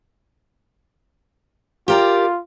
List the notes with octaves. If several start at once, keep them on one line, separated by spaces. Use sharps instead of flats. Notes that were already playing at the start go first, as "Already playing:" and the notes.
F4 G4 A#4 D5